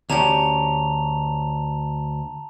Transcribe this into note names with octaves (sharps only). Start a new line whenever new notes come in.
D2 C#4 G4 A5 A#5 F7